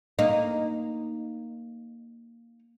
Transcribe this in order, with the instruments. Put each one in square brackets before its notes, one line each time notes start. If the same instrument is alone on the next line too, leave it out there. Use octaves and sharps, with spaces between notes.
[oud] A#3 D#4